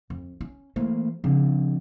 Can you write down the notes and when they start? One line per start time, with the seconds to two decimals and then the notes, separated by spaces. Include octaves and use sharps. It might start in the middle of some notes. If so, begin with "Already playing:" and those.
0.10 F2
0.41 C#4
0.76 E3 A3 A#3 C5
1.24 C#3 F3 C4 D4